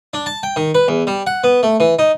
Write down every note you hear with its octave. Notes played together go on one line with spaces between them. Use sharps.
D4
A5
G5
D#3
B4
E2
G3
F#5
B3
A3
E3
D#4